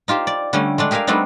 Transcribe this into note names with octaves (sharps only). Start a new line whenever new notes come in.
D#4 F4 G4 C5
D5
D3 G3 A3 C#4
G#3 A3 D4
G4 G#4 A#4 E5 F5
G3 A3 B3 C4 D4 D#4